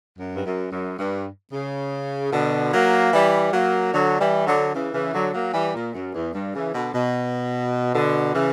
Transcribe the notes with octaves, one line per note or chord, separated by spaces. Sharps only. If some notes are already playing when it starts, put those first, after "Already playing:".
F#2
G2
F#2
F#2
G2
C#3
B2 D3
F#3 A#3
E3 G3
F#3 A#3
D3 F#3
E3 G3
D3 F#3
C#3 E3
C#3 E3
D3 F#3
F#3 A#3
E3 G3
A#2
F#2
E2
G2
C#3 E3
B2 D3
B2
B2 D3
C#3 E3